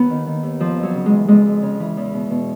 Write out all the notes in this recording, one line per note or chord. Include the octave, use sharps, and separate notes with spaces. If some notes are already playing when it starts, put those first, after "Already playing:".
Already playing: D#2 B3
D#3
D#3
D#2
F2 F3
F2
F#3
C#3
G#3
E3
F2 G#3
F2
C#3
E3
E2
B2
B2